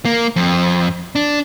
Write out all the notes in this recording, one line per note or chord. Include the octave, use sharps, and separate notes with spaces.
A#3
F2
D4